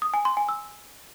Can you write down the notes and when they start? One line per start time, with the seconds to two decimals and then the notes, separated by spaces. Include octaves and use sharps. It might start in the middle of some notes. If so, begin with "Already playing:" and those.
0.02 D#6
0.14 G#5
0.25 C6
0.37 G#5
0.49 E6